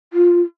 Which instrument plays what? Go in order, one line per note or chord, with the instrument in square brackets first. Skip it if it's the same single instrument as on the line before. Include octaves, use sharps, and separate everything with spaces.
[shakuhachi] F4